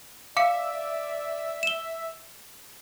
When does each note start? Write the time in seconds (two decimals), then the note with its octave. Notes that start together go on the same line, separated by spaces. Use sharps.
0.37 D5 E5 F5 D6 C#7
1.63 E7 G7